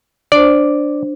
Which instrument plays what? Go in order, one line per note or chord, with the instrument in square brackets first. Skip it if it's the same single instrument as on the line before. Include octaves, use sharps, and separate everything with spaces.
[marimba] D4 C5 [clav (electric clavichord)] D5